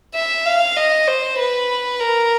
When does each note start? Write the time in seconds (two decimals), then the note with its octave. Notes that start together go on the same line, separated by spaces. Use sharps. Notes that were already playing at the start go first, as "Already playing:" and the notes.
0.15 E5
0.46 F5
0.77 D#5
1.08 C5
1.39 B4
2.00 A#4